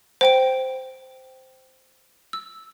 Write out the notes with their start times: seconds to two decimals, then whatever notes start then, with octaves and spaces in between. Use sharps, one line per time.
0.21 C5 G5 D7
2.33 E6